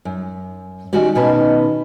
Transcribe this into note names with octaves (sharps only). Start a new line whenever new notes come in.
F#2
D#3 C#4 F#4 G4 D5
B2 D#3 C#4 B4 A5